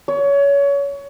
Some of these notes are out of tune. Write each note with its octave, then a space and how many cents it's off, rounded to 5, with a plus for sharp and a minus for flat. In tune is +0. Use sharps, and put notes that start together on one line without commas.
C#5 +25